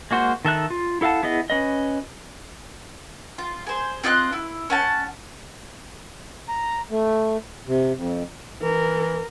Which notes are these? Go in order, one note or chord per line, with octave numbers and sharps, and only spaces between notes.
G#3 A#3 F#4 C5
D#3 A4 E5 F#6
F4
E4 A4 F5 F#5 A5
B3 E4 G#4 D#5
C#4 B4 D#5
F4
G#4 C5
C4 F4 D#5 F#6
E4
C#4 F#5 A5
A#5
A3
C3
F2
E3 A#4